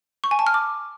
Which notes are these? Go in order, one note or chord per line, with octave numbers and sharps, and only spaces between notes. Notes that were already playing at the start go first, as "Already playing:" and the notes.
C#6
G#5
A5
F6
D6